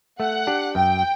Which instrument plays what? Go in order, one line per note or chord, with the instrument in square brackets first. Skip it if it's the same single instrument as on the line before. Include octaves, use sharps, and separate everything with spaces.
[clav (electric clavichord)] A3 [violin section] F#5
[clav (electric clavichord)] D4 G4
[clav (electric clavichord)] F#2 [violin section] G5